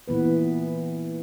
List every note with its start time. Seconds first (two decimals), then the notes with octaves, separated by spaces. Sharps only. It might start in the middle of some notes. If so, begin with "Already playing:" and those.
0.08 A#2 E3 B3 B4